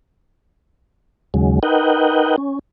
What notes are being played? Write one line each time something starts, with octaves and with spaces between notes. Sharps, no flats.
D#2 C#3 F#3 G#3
D#4 A#4 B4 D#5 F#5 G5
C#4